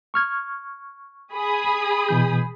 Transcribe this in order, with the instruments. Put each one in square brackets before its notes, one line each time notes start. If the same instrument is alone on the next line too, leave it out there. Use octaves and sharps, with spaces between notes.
[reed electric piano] C#6 F6 G#6
[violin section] G#4 B5 D#6
[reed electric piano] B2 E3 G6